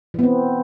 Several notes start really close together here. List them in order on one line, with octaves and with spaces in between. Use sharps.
E3 B3 C4